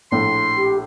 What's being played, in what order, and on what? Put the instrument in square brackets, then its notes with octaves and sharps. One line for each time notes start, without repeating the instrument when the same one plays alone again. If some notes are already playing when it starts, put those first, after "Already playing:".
[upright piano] A#1 A2 [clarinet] C6
[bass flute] G4